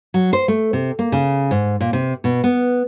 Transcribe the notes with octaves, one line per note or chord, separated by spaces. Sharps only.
F#3
C5
A3
C3
A#3
C#3
G#2
A#2
C3
B2
B3